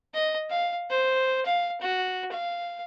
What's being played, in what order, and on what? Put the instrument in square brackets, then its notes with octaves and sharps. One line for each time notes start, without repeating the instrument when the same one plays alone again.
[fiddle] D#5
F5
C5
F5
F#4
F5